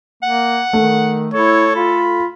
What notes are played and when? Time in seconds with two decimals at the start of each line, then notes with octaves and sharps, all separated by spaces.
0.23 A#3 F#5
0.73 D#3 A3
1.34 E4 A4 C#5
1.76 F4 B5